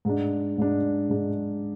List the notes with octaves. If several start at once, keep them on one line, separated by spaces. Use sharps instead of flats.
G#2 G#3 D4
G#2 G#3 D4
G#2 G#3 D4